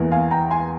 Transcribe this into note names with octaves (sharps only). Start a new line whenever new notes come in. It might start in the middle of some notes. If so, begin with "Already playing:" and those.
Already playing: E2 E3 A#3
F5 G#5
G5 A#5
G#5 C6